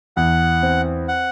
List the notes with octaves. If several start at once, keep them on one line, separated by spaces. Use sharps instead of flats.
E2 F#5
C4
F#5